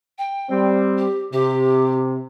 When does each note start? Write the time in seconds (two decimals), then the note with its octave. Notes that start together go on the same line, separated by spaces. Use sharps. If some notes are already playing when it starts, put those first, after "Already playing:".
0.18 G5
0.49 G3 C4
0.98 G4
1.33 C3 G4